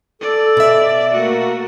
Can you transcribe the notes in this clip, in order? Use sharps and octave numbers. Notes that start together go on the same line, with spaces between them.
A4 D5
B2 E5
A3 A#3 F#4